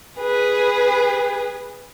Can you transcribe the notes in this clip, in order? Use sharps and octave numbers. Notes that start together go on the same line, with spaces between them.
G#4 B4